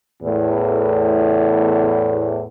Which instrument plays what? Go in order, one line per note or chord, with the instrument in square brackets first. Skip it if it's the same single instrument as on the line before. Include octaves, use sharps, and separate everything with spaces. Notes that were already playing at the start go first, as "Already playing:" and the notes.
[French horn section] E2 A2